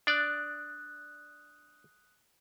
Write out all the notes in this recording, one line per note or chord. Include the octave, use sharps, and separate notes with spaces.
D4 D5 D#6 F#6